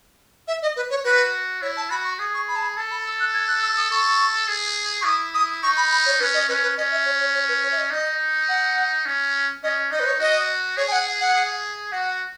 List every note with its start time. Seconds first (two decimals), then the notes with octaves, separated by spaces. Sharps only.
0.47 E5
0.62 D#5
0.76 B4
0.90 C#5
1.04 F#4 B4
1.62 E4 C#5
1.76 A5
1.90 F#4 B5
2.04 C#6
2.19 G#4 D#6
2.34 C#6
2.48 B5
2.56 A5
2.62 B5
2.77 A4 A5
2.91 B5
3.05 E6
3.20 F#6
3.34 G#6
3.48 F#6
3.62 E6
3.77 D#6
3.91 A4 C#6
4.48 G#4
5.01 C#6
5.05 E4 D#6
5.34 D#6
5.63 D#4 C#6
5.77 B5
5.91 B5
6.06 C#5
6.20 C#4 B4
6.34 D#5
6.48 C#4 B4
6.63 B4
6.77 C#4 D#5
6.91 E5
7.05 C#5
7.20 C#5
7.34 C#5
7.48 B4
7.63 C#5
7.72 E5
7.78 D#5
7.91 D#4 D#5
8.48 F#5
9.06 C#4
9.63 C#4 D#5
9.91 D#4 D#5
10.00 B4
10.06 C#5
10.20 F#4 D#5
10.77 G#4 C#5
10.88 G#5
10.92 F#5
11.20 F#5
11.35 G#4
11.92 F#4 F#5